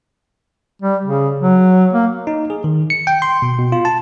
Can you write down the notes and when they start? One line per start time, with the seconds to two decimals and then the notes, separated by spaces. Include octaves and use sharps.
0.82 G3
1.05 C#3
1.40 F#3
1.93 A#3
2.27 D#4
2.50 G#4
2.64 D#3
2.90 C#7
3.07 G5
3.22 C6
3.42 B2
3.58 B2
3.72 F4
3.85 A5